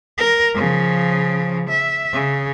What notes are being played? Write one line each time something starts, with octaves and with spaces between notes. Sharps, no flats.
A#4
C#3 F3
E5
C#3